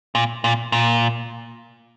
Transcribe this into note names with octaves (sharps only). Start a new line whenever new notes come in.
A#2
A#2
A#2